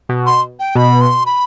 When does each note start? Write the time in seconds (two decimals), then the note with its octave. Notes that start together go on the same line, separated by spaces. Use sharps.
0.09 B2
0.26 C6
0.60 G5
0.75 B2 B5
1.01 C6
1.26 B5